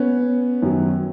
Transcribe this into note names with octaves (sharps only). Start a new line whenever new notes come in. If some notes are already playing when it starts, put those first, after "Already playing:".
Already playing: B3 C#4
F#2 D#3 F#3